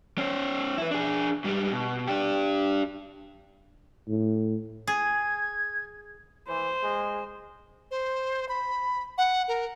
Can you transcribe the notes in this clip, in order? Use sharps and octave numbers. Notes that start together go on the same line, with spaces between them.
C#4 C5
E4 B4
D4 G#4
G#2 G3
B2
D4 G4
A2
G#4 G#6
E3 C5
G#3
C5
B5
F#5
A#4